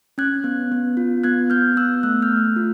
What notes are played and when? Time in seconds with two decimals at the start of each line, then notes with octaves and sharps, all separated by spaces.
0.18 C#4 F#6 G#6
0.44 B3
0.72 B3
0.97 F4
1.24 B3 F#6 G#6
1.50 B3 F6 G6
1.76 B3 E6 F#6
2.03 A3 E6 F#6
2.22 F6 G6
2.30 A3
2.56 F4